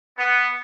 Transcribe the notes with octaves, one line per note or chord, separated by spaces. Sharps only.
B3